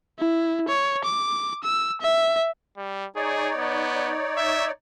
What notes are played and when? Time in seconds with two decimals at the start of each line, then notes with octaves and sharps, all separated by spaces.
0.18 E4
0.68 C#5
1.04 D6
1.64 E6
2.01 E5
2.77 G3
3.16 D#4 G#4 C#5 D5
3.57 B3
4.37 E5